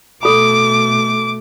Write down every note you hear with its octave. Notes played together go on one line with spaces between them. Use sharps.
B2 A3 A4 B5 D6